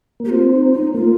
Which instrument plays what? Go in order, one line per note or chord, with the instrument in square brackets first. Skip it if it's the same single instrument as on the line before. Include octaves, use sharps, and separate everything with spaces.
[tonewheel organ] A#3
[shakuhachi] G4
[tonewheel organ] C4 [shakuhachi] F4
[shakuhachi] D#4
D#4
[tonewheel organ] A#3 [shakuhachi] F4